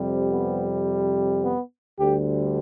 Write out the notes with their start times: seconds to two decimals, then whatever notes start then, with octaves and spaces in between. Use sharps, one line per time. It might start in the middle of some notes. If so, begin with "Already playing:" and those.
Already playing: F2 C3 G3
0.31 B3
1.43 B3
1.98 D2 D3 G3 G4